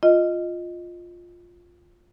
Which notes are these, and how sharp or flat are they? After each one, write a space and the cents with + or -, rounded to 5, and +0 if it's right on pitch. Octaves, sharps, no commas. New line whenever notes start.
F4 +5 D#5 +0